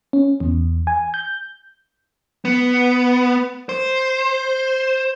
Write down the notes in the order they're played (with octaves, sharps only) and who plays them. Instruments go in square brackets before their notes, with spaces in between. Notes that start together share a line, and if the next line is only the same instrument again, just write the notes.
[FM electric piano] C#4
E2
G#5
G6
[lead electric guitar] B3
C5